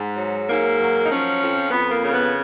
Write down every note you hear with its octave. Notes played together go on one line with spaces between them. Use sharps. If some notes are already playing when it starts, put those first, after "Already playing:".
Already playing: G#2
F#3
G#2 A#3
F#3
D#4
F3 C#4
F2
F2 B3
A#3
C#3
B3